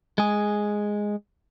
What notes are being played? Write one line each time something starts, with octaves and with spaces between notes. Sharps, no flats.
G#3 G#4